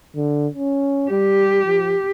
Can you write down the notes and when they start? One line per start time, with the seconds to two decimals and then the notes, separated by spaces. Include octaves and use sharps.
0.16 D3
0.54 C#4
1.11 G3 G4
1.65 F3